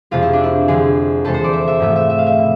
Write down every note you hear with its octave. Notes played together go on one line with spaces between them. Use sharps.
F2 C3 G#3 F4
E4
D4
E4
F2 D3 G#3 G#4
E2 C3 G#3 A4
C5
D5
E5
E5
G#2 F3 A3 E5
E5
E5
F5
E5
B2